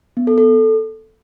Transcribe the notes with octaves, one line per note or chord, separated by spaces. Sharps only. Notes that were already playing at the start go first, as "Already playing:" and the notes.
B3
A4
A4